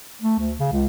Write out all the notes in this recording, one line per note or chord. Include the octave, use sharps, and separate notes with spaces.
A3
D2
C#3
C#2